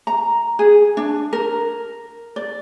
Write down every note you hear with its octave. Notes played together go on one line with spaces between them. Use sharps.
A#5
G#4
D4
A#4
D5